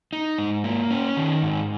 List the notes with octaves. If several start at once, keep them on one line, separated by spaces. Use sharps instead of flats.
D#4
G#2
A#3
C#4
D#3
G#2